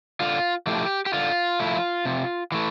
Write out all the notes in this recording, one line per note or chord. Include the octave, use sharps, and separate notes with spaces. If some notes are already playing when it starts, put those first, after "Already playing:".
D3 F4
F3 A3 E4 G4
G4
D3 F4
F3 A3 E4
C3
E3 A3